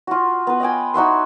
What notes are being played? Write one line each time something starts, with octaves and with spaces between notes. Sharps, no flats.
F4 F#4
B3 B4
D#5 F5 G5 G#5
D#4 F#4 E5 C6